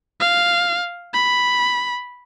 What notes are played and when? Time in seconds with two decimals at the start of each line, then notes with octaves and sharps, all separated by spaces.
0.20 F5
1.14 B5